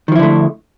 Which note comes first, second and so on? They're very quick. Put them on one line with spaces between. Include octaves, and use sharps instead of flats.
D#3 F3 E4 D3 A3